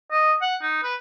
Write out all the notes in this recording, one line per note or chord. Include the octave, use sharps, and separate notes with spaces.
D#5
F#5
D#4
B4